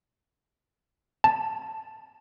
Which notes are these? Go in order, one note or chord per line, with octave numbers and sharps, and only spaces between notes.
A5